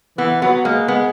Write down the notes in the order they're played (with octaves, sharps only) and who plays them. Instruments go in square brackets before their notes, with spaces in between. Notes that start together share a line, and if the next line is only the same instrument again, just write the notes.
[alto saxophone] E3 [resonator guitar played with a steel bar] B3
[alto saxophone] F#3 [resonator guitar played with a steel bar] B3
[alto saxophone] G#3 [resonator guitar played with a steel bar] A#3
[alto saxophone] G#3 [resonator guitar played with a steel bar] B3